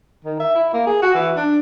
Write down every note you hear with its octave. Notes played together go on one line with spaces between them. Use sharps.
D#3
E5
E4
A#3
G#4
F#4
E3
D4